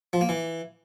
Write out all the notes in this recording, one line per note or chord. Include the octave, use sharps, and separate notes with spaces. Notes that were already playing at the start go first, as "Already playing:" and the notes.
F3
A#3
E3